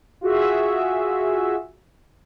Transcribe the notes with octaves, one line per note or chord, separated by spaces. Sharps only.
F4 F#4 G#4 E5